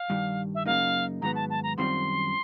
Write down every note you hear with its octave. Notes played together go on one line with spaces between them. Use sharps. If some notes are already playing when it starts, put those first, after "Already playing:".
Already playing: F5
G2 D#3 G3
E5
F#2 C#3 F#3 A#3 D#4 F5
G#2 D#3 F#3 B3 A#5
A5
A5
A#5
F#2 D#3 G3 C4 F4 C6